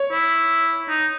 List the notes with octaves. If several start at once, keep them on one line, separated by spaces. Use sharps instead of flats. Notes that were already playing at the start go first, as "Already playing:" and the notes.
Already playing: C#5
E4
D#4